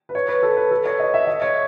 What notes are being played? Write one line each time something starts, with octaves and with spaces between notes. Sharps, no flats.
B4
C#5
B4
A4
B4
A4
C#5
D#5
E5
D#5
C#5